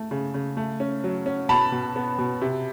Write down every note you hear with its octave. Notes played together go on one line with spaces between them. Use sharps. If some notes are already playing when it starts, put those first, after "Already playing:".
Already playing: A3
C#3
C#3
A3
C#4
F#3
C#4
B2 A5 B5
B2
B3
B2
C3